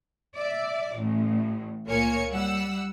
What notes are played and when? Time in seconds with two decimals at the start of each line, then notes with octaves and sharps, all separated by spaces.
0.35 D5 E5
0.94 A1 A2
1.86 C#2 A#2 A#3 C#5 G#5 C#7
2.31 G3 F#5 E6